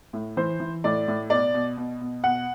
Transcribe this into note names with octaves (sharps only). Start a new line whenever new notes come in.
A2
E3 C5
E3
A2 D5
A2
B2 D5
B2
B2
B2
B2 F#5